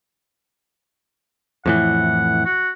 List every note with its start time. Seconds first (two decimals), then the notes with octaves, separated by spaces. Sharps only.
1.66 F2 A2 E3 F#5
2.45 F#4